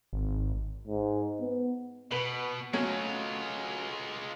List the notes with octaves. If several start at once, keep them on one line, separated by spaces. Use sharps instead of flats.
G#1
G#2
B3
B2 B4 F#7
F#3 G#3 A3 C#4 F4